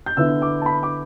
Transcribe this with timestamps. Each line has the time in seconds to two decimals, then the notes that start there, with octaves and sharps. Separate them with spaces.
0.06 G6
0.17 D3 B3 E4 E6
0.42 D6
0.62 A5
0.66 B5
0.83 D6